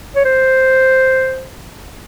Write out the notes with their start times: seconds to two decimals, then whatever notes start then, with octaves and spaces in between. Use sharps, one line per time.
0.16 C#5
0.25 C5